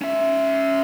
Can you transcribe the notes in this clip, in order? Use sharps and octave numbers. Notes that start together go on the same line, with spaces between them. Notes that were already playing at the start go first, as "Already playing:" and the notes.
C#4 E5